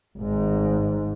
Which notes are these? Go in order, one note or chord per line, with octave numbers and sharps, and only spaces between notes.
G#1 G#2